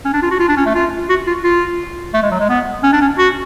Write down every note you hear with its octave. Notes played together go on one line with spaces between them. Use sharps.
C#4
D4
F4
F#4
F4
D4
C#4
A3
F4
F#4
F4
F4
A3
G#3
F#3
G#3
B3
C#4
D4
C#4
F#4